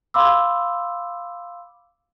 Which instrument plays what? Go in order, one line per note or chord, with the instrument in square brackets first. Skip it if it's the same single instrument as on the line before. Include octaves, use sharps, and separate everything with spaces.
[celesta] F5 B5 C6 D6 E6